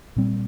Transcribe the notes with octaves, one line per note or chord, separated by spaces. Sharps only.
A#2 G3 C4